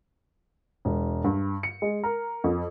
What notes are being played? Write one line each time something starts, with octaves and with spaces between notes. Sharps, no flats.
E1
G2
C#7
G#3
A#4
F2